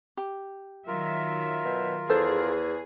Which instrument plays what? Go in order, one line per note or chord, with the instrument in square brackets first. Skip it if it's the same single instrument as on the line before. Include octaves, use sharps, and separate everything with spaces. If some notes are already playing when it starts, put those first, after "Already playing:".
[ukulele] G4
[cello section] D#3 F#3 E5 [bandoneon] F4 A#4
[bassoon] B2
[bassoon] E2 [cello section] G#4 [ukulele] A4 C5